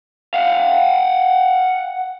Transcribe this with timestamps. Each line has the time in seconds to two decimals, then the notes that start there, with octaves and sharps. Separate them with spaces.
0.34 F5 F#5